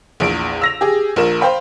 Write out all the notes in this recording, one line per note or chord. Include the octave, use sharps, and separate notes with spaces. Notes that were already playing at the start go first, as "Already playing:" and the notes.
A#1 E2 D7
E6 A#6 F7
G4 G#4
A#1 F3 A#4 E7
C5 F5 G5 B5